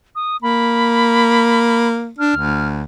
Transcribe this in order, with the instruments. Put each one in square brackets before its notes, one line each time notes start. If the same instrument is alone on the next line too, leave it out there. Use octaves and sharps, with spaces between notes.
[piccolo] D#6
[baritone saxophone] A#3 [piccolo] B5
[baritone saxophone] D4 [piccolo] F6
[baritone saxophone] D2